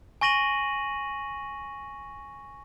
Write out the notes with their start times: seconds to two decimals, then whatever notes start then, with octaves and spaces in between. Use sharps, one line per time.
0.21 G#5 C#6 A#6 D#7 F#7